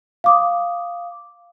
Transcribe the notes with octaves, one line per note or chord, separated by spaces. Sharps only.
F5 D6 D#6